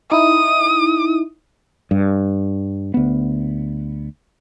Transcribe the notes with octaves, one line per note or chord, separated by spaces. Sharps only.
D#4 E4 D#6
G2
D2 B3